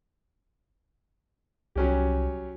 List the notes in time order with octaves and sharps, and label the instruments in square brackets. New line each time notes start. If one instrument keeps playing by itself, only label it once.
[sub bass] C2 [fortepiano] F#3 C#4 G4